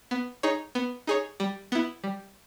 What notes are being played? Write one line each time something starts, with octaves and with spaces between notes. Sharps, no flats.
B3
D#4 G#4 C#5
B3
D#4 G#4 C#5
G3
B3 E4
G3